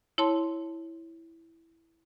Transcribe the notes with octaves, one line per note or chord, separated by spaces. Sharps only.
E4 C#5 A5 C6